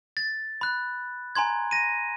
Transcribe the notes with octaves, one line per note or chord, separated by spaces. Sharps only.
A6
B5 F#6
G#5 A#5 C6 G#6
A#6 D#7